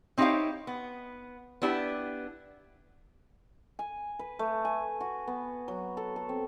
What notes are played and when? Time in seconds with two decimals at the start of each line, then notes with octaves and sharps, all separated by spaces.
0.18 C4 D#4 E4 G4 C#5 F5
0.67 B3
1.62 B3 D4 E4 G4
3.79 G#5
4.19 B4
4.39 A3
4.65 G#5
5.01 F#4
5.27 B3
5.68 F#3
5.97 A4
6.16 A4
6.29 C4